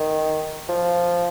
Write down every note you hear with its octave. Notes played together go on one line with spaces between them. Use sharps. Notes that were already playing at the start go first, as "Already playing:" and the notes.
Already playing: D#3
F3